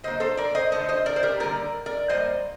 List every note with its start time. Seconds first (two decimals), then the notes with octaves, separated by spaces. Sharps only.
0.04 D3 F#3 A#3 C5 D#5
0.20 A4 C5
0.37 A#4 D5
0.55 C5 D#5
0.72 D3 A3 C5 D#5
0.89 C5 D#5
1.06 A#4 D5
1.16 C5
1.23 G4 A#4
1.40 D3 G3 A#3 A#4 D5
1.86 A#4 D5
2.09 A2 G3 A#3 C5 D#5